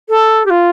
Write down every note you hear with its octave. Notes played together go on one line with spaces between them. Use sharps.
A4
G4
F4